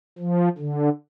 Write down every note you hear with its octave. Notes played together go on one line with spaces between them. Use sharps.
F3
D3